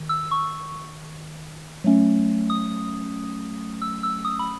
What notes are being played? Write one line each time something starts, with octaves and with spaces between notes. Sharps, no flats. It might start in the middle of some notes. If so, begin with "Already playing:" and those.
Already playing: D#3
E6
C#6
F#3 A3 C#4
D#6
E6
E6
D#6
B5